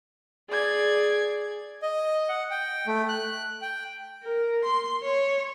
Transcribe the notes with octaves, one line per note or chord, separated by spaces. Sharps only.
G#4 D5 G#6
D#5
F#5
G5
A3
F#6
G5
A#4
C6
C#5